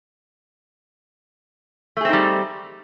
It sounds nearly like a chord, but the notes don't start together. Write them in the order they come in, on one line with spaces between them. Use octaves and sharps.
A3 G#4 C4 D#4 G3